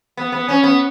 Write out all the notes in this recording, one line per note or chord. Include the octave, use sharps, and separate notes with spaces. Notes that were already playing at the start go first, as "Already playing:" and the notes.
B3
B3
C#4
B3